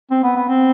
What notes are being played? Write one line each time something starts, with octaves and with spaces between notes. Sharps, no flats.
C4
B3
B3
C4